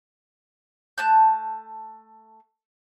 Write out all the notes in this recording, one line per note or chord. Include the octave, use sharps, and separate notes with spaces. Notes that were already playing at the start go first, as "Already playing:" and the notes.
A3 A5 F#6 G6